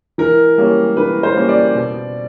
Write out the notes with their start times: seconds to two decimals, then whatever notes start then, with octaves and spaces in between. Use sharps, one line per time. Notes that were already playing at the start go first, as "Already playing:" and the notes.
0.18 E3 A#4
0.58 G3 A#3 C#4
0.97 E3 B4
1.23 C5
1.36 G3 A#3 C#4
1.49 D5
1.75 B2